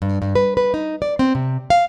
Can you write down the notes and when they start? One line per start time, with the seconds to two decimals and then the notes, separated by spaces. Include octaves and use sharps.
0.02 G2
0.22 G2
0.35 B4
0.57 B4
0.74 D#4
1.02 D5
1.19 C4
1.35 C3
1.70 F5